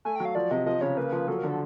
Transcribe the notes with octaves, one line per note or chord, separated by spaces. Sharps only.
A3 G#5
G5
F#3
F5
F3 D5
C3 D#5
F3 D#5
C#3 C#5
A#3 B4
F3
F#3 A4
A#4
D3
A4